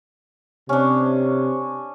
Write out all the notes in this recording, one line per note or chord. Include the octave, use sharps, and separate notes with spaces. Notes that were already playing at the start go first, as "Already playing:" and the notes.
C3 C#4 D4